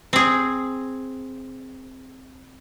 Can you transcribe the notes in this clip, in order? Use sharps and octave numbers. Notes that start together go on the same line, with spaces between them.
C4 G#4